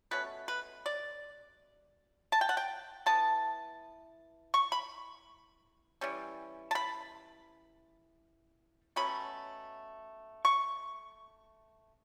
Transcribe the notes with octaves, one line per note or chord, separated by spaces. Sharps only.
B2 A3 C#4 B4
B4
D5
A5
G5
F#5
G5
E3 B3 A5
C#6
B5
E3 G3 C#4
A5
B5
B2 F#3 A3 C#4 B5
C#6